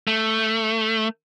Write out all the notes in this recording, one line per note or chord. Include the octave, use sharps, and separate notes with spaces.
A3